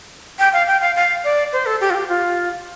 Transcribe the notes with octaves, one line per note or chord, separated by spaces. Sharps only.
G5
F5
G5
F5
F5
D5
C5
A4
G4
F4
G4
F4